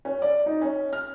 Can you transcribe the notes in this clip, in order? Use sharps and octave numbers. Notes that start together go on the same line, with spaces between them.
C#4
D5
D#4
C#4
F6